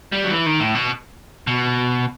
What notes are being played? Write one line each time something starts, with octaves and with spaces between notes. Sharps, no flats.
G3
F#3
E3
D#3
A2
B2
B2